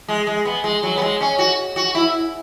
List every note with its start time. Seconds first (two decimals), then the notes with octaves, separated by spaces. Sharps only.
0.08 G#3
0.27 G#3
0.45 B3
0.64 G#3
0.83 F#3
0.97 B3
1.02 G#3
1.21 C#4
1.39 F#4
1.76 F#4
1.95 E4